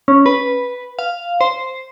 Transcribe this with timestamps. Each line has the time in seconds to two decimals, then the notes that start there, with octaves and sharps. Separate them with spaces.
0.08 C#4
0.26 B4
0.99 F5
1.41 C5